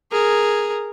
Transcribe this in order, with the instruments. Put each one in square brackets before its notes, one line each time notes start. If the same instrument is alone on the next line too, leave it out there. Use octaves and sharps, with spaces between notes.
[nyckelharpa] G#4 A#4